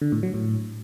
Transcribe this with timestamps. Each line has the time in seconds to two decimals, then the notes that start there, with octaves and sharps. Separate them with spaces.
0.01 D3
0.12 A2
0.23 F#3
0.34 A2